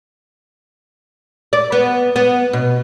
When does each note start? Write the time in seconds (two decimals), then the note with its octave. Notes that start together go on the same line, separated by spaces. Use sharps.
1.53 D5
1.72 B3
2.16 B3
2.53 B2